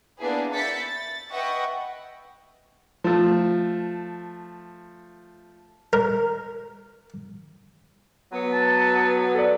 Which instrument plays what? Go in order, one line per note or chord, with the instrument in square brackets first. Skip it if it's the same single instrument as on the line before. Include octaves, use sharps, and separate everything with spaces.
[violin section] A#3 B3 D4 E4 G#4 B4
E5 B5 G6 A6 B6 C#7
A6
B4 D#5 E5 F#5 G5 C#6
[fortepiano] F3 A3
[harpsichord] A#4
[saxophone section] F#3 B3
[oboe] A5
[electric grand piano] A4 D5